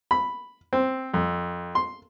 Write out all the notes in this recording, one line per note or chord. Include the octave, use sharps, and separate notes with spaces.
B5
C4
F2
C6